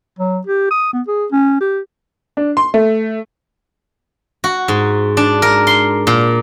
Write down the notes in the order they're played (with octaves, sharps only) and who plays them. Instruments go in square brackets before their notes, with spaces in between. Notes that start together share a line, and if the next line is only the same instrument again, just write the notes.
[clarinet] F#3
G4
D#6
B3
G#4
C#4
G4
[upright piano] D4
C6
A3
[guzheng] F#4
G#2
D4
A#4
C6
A#2